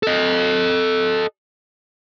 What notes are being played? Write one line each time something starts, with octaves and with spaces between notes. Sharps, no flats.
A4 D#5